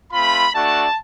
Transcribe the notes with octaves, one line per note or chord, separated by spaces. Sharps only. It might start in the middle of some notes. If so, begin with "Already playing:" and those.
A3 C4 F4 B5
A3 D4 F#4 A5